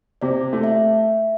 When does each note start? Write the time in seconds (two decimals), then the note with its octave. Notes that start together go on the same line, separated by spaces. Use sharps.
0.21 C3 D5
0.53 A3
0.63 E5